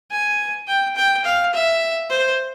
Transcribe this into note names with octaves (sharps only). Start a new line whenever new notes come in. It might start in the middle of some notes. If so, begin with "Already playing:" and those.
G#5
G5
G5
F5
E5
C5